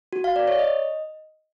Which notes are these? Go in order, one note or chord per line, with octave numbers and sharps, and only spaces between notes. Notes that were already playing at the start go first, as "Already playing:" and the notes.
F#4
F5
D5
C#5
D#5